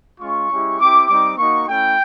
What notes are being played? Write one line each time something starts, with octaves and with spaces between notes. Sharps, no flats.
G#3 C#4 F4 C#6
G#3 C#4 E4 G4
C4 E4 G4 D6
G3 C4 D#4 D6
A#3 D#4 F#4 C#6
A3 C#4 E4 G5